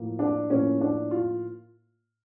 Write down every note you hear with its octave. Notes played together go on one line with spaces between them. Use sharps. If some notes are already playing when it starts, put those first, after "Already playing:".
Already playing: A2 F3 A#3
D4
A2 F3 A#3 C#4
D4
F4